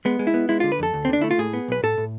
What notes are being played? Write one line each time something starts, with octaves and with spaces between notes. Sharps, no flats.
G#3 B3
G#3
E4
B3
G#3 E4
D3 F4
B4
F2 A4
D2
C4
D3 D4
A3 E4
F4
A2 G#4
B3
B1 B4
A2 A4
A2